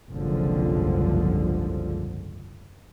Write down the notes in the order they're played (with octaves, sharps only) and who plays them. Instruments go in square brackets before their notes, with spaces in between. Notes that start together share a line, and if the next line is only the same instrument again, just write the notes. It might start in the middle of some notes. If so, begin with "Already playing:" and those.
[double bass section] F#1 C2 G#2 D3 F3